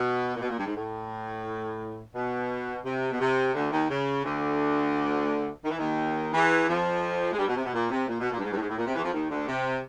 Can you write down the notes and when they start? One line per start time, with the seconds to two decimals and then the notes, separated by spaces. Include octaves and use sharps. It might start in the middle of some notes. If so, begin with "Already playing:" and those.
Already playing: B2
0.36 A#2
0.41 B2
0.49 A#2
0.59 G2
0.66 G#2
0.75 A2
2.15 B2
2.85 C3
3.11 B2
3.19 C3
3.54 D2 D3
3.71 D#2 D#3
3.89 C#3
4.24 D2 D3
5.64 D#3
5.70 E3
5.78 D#2 D#3
6.33 E2 E3
6.68 F2 F3
7.32 G#3
7.38 G2 G3
7.47 B2
7.55 C3
7.64 B2
7.73 A#2
7.90 C3
8.08 A#2
8.20 B2
8.31 A#2
8.38 G2
8.43 G#2
8.51 G2
8.56 A2
8.60 G#2
8.69 A2
8.77 A#2
8.86 C3
8.95 E2 E3
9.03 F2 F3
9.12 D#2 D#3
9.30 D2 D3
9.47 C3